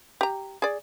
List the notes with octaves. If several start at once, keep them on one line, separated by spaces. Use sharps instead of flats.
G4 A#5
G#4 D5